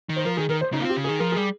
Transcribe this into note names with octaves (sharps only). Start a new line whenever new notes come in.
D#3
C5
F3 A#4
D#3 G#4
D#3 A#4
C5
C#3 D#4
A#3 F4
C4 G4
C#3
D#3 G#4
F3 A#4
G3 G#4